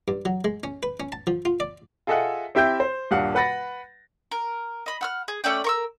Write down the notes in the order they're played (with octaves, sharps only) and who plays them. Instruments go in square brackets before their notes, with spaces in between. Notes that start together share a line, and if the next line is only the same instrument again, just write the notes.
[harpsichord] G2
F#3
G#3
C#4
B4
C#4
A5
F3
F4
D5
[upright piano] F4 G#4 A4 D#5 E5 F#5
C4 E4 G4 E5 G5 G6
C5
D#1 G2 G4 F5 F#5
B4 F#5 B5 A6 A#6
[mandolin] A#4
D#5 B5
F#5 E6 F6
G#4
A3 C#4 D5 G5
A#4 C#6 E6